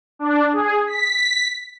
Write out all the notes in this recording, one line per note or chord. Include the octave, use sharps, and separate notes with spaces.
D4
G#4
B6